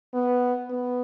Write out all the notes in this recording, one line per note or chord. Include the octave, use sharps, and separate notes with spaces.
B3
B3